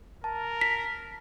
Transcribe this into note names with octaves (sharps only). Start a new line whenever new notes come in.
A#4 A5
B6